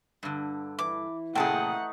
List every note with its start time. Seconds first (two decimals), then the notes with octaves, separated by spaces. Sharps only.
0.23 G2 D3
0.79 E3 D6
1.35 A#2 C#3 A3 D#4 G#4 F#5 G5 A5